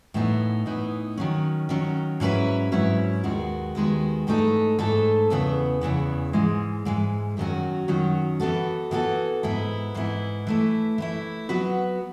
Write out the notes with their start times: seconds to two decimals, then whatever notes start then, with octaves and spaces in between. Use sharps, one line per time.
0.14 A2 E3 B3 D#4
0.65 A2 E3 B3 D#4
1.17 D#3 F#3 C#4
1.69 D#3 F#3 C#4
2.20 G#2 F#3 C#4 E4 B4
2.72 G#2 F#3 C#4 E4 B4
3.23 D#2 D#3 G#3 B3 F#4
3.75 D#2 D#3 G#3 B3 F#4
4.27 G#2 E3 A3 D#4 A4
4.79 G#2 E3 A3 D#4 A4
5.30 E2 C#3 E3 B3
5.81 E2 C#3 E3 B3
6.33 G#2 E3 G#3
6.85 G#2 E3 G#3
7.37 F#2 D#3 F#3 C#4 F#4
7.88 F#2 D#3 F#3 C#4 F#4
8.40 E3 B3 F#4 A4
8.91 E3 B3 F#4 A4
9.43 G#2 E3 B3 E4
9.94 G#2 E3 B3 E4
10.47 E3 A3 E4
10.98 E3 A3 E4
11.49 F#3 B3 F#4 B4